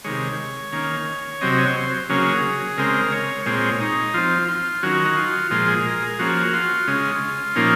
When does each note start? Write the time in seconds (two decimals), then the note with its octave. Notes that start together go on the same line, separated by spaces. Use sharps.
0.04 C3 D#3 G#3 C#5
0.73 D#3 A#3 C#4
1.41 C3 F#3 C4 D#5
1.58 C#5
1.76 C5
2.09 C#3 F#3 A#3 C#4 G#4
2.78 C#3 G#3 C4 A#4
3.12 C#5
3.46 A#2 G#3 C4 C#5
3.80 D#4
4.14 F3 C4 F4
4.48 F4
4.83 D#3 F#3 C#4 F#4
5.05 D#4
5.16 F4
5.51 A#2 F3 G#3 F4
5.68 G#4
5.86 A#4
6.02 G#4
6.19 F3 A#3 C#4 F#4
6.53 F4
6.87 C#3 G#3 C#4
7.55 A#2 F3 A#3 C#4 D#4